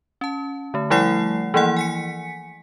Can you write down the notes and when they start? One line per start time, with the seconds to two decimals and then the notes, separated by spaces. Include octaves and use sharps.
0.21 C#4 A5
0.74 D3 A3
0.90 F3 G3 A3 E4 F#5 C7
1.54 E3 F3 A#3 E4 F#5
1.76 G#5 B6 C#7